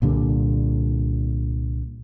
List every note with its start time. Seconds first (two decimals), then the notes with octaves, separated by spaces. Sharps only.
0.02 C2 A#2 D3 G3